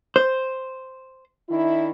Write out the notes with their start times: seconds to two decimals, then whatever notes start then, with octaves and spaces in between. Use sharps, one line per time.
0.16 C5
1.49 D#3 D4 E4